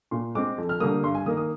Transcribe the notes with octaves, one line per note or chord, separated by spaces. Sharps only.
A#2 C6
G#3 C4 D6
F2
F6
D3 G3 A#3 D#6
G2 C6
G#5
D#3 A#3 D#6
D#6